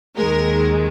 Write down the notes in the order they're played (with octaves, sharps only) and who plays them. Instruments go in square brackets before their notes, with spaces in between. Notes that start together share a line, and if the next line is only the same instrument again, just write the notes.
[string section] D#2 D#3 G#3 A#4